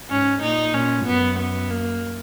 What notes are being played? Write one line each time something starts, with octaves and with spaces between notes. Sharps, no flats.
G#2 C#4
A#2 D#4
A#2 C#4
F#2 B3
B3
A#3